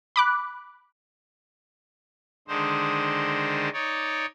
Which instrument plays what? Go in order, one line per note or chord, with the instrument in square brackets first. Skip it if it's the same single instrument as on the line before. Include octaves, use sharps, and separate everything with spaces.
[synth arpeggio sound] B5 D6 F#6
[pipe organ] D3 D#3 G#3 D4 D#4 C5
D#4 C#5 D5